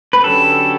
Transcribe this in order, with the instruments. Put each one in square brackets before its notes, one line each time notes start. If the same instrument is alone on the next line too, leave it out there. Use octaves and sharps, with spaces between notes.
[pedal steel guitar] B4
[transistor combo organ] D3 F#3 C#4 G4 B4 [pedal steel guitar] A4